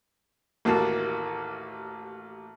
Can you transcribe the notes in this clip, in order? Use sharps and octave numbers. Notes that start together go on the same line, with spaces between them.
A1 D#2 A#3 F#4 A5